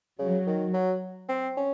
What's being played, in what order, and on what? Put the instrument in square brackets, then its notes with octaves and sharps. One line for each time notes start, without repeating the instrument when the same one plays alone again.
[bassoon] C#3 [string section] F#3
[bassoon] D#3
F#3
C4
C#4